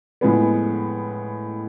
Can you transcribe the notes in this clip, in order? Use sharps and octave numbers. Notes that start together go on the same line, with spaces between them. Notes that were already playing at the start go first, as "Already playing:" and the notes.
A2 F3 G#3 B3